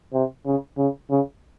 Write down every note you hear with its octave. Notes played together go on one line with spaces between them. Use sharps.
C3
C#3
C#3
C#3